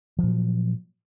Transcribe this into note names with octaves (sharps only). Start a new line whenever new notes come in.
A#2 F3 F#3